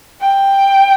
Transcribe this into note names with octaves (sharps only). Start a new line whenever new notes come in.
G5